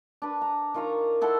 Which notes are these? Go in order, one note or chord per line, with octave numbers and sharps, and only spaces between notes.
D4 B4
A#5
D#3 F4 C#5 A#5
E4 A4 F#5 C6